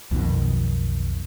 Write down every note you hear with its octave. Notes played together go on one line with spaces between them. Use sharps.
B1 F2 B2 D#3